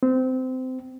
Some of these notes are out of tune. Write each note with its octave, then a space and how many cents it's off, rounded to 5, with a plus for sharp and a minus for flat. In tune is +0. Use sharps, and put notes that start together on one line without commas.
C4 -20